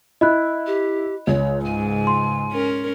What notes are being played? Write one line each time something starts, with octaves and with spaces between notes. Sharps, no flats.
E4 D#5 B5 F#6
G4
C#2 C#5
G#2 G#5
C6
C#4 A#4